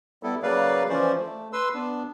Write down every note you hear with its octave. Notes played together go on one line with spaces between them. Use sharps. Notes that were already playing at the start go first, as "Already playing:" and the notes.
G3 B3 E4 A4
C#3 F#3 A#3 B4 D5 F5
E3 F3 C#4 C5 D5
A3
B4 C6 E6
B3 D4